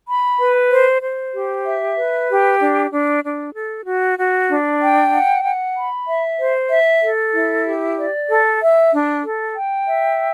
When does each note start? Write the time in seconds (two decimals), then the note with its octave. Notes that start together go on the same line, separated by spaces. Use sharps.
0.07 B5
0.39 B4
0.70 C5
1.02 C5
1.34 G4
1.65 E5
1.96 B4
2.28 G4
2.60 D4
2.91 D4
3.23 D4
3.54 A4
3.86 F#4
4.18 F#4
4.50 D4
4.81 G5
5.13 F#5
5.44 F#5
5.76 B5
6.08 E5
6.39 C5
6.70 E5
7.02 A4
7.34 E4
7.65 G4
7.98 D5
8.29 A4
8.61 E5
8.93 D4
9.24 A4
9.56 G5
9.87 E5